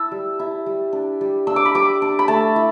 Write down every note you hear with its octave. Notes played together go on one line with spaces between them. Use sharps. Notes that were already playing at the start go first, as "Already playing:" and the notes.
Already playing: E4 A5 E6
G3
E4
G3
D4
G3
D4 E6
D6
B5
G3 D6
D4
B5
A3 A5
E4